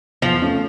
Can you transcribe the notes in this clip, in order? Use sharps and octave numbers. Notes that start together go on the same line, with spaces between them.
E2 F3
C#3 F3 A3 C#4